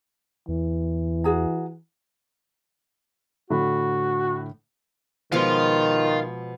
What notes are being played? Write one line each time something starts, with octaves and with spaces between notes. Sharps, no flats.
E2 E3
F#4 G#4 A#5
A2 D3 F#4 B5
B2 D#3 F3 G#3 F5 C6